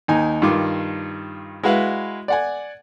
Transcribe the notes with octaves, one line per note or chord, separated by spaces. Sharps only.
D#2 D#4 G#5
G2 D#3 F4 D6
G#3 E4 F#4 B4 F5
D5 F#5 G#5